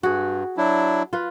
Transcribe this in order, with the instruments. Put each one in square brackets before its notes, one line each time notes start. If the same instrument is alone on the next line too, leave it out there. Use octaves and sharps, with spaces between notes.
[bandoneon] G2 [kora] F#4 G#4
[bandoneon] F#3 D4 E4
[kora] F4 B4